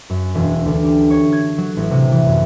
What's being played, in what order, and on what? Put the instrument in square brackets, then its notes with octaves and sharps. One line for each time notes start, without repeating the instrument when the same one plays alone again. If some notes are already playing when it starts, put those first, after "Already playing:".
[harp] F#2
E1
D2
G4
C#5
G#6
F#3
A1
C3
E3
F#2